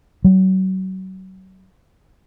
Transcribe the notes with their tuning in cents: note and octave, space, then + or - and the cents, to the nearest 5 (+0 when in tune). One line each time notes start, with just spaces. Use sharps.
F#3 +30